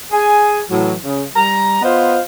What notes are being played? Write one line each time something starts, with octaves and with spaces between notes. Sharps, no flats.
G#4 G#5
A2 E3 F#3
C#3
G3 A#5
B3 F4 C5 D#5 F5